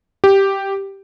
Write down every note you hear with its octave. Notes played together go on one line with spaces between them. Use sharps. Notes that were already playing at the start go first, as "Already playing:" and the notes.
G4